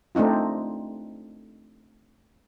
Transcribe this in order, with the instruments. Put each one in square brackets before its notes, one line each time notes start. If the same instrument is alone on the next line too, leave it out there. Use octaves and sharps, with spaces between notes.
[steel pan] A3 C4 D4 D#4 F4